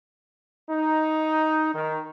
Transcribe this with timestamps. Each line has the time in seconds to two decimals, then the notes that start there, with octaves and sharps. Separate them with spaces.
0.69 D#4
1.72 D#3